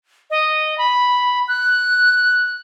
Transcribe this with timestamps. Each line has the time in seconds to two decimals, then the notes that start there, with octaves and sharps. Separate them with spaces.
0.30 D#5
0.78 B5
1.48 F#6